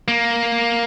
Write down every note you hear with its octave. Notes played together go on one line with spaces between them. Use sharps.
A#3